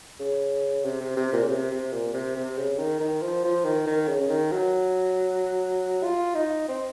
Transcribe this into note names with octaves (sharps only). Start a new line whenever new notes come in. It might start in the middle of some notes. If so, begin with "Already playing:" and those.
C#3
C3
C3
C3
A#2
C#3
C3
C3
A#2
C3
C3
C#3
D#3
D#3
F3
F3
D#3
D#3
C#3
C#3
D#3
F#3
F4
D#4
C4